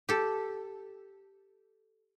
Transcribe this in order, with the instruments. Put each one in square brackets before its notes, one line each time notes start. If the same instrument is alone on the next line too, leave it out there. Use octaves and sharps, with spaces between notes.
[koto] G4 A4